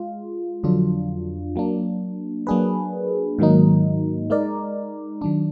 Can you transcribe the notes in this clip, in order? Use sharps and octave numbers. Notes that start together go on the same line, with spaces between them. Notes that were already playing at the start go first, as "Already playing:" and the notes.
Already playing: G#3 F4
F2 D3 F#3 D4 F4
F#3 A#3 D4
F#3 A#3 D4 G#4 B4
G#2 D#3 F#3 A#3 D#4
G#3 D#4 A#4 D5
D#3 F#3 D4